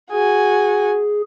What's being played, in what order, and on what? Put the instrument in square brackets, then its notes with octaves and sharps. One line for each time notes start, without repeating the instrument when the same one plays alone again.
[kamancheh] F#4 G#5 [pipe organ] G#4